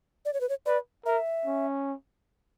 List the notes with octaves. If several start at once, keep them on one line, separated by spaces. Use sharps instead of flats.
D5
C#5
B4
C#5
B4 D5
A#4 E5
C#4